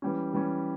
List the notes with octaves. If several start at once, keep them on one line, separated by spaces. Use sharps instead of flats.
E3 G3 C#4
E3 G3 C#4